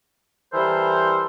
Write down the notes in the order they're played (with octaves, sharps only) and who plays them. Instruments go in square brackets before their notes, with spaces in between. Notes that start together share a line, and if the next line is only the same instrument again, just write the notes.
[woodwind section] E3 G3 A4 A#4 C5